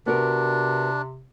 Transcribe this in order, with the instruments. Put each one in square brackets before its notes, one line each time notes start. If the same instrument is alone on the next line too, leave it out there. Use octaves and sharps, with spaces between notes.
[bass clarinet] C3 [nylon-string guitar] B3 F#4 A#4 [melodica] D4